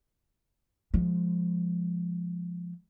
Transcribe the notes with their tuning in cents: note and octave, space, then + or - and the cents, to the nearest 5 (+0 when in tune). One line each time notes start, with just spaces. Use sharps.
F3 +0 G#3 +0